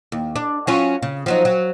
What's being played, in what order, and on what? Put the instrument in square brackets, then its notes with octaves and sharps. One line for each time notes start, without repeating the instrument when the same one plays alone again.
[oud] D#2
D4
F#3 C#4 F4
C#3
F3 F#3 D#4
F#3